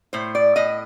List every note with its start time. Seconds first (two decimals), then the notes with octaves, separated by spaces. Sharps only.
0.13 A2 C5
0.35 D5
0.56 A2 D#5